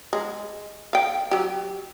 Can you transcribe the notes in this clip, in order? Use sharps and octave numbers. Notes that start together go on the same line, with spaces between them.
G#3
F5 G5
F#3 G4